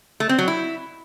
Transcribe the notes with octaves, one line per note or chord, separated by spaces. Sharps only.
A3
C4
F#3
E4